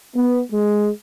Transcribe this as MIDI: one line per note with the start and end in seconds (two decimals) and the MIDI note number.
0.16 0.41 59
0.53 0.89 56